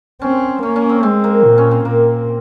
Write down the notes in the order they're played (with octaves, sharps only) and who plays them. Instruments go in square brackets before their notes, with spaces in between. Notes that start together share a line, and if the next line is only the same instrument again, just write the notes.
[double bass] C4 [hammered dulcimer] C#4
[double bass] A#3 [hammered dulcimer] C#4
[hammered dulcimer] C#4
C4
[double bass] G#3 [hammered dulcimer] C4
[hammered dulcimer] A#3
[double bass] A#2
[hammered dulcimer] C#4
C4
[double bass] A#2 [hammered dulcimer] A#3